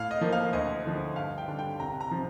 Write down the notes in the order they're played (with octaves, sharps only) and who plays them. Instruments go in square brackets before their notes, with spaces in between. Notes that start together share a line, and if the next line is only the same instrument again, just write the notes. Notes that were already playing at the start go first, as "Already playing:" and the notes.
Already playing: [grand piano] A2 F5
D#5
F3 A#3
F5
D2 D#5
D3 F3
G2 F5
G5
D3 G3 D4
G5
C2 A#5
A#5
C3 F3